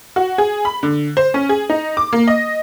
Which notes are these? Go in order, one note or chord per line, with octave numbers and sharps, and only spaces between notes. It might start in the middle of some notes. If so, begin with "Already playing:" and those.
F#4
G#4
B5
D3
C5
C#4
G#4
D#4
D6
A#3
D#5